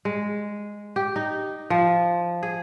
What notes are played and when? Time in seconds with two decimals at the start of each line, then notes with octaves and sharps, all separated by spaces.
0.05 G#3
0.96 G4
1.16 D#4
1.70 F3
2.43 G#4